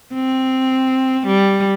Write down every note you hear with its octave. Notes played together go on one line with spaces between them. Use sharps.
C4
G3